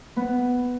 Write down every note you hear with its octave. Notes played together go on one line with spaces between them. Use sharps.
B3